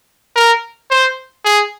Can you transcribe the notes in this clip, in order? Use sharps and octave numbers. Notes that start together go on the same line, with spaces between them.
A#4
C5
G#4